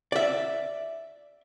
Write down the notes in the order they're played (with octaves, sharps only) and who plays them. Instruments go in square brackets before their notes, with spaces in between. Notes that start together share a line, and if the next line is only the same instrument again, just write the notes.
[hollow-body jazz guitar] D5 E5